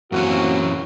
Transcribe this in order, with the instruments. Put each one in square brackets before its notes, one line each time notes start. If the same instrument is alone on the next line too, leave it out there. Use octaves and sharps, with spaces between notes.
[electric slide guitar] F#2 E3 C#4 [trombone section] A#3 C4 F#4